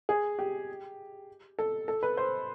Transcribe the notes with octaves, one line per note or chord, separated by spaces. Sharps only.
G#4
G4
A4
A4
B4
C5